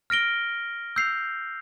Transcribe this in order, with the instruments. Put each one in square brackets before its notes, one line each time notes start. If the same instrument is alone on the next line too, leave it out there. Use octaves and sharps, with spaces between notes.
[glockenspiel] F6 A#6 D7 G7
E6 G6 C7 F7